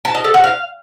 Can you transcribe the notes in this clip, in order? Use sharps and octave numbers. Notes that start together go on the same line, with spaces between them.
A5
D#5
A4
F#4
F5